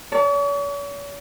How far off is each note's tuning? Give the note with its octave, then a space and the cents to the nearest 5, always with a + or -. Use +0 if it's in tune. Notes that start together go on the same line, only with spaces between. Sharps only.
C#5 +45 A5 -20